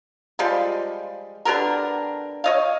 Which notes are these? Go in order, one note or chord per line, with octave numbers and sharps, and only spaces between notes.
F3 G3 G#3
D3 B3 G4 A#4
C#5 D#5 F5